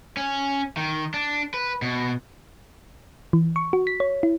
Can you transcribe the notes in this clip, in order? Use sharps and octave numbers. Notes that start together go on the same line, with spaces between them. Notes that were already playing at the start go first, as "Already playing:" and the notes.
C#4
D#3
D4
B4
B2
E3
C#6
F#4
B6
C#5
E4